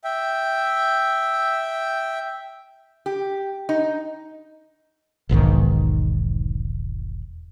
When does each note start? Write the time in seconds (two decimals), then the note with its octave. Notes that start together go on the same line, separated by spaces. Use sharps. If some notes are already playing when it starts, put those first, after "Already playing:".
0.04 E5 G5
3.06 G4
3.69 D#4
5.29 E1 B1 G#2 D#3